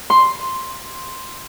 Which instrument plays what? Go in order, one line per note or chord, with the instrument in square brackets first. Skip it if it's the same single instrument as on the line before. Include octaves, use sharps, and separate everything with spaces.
[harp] C6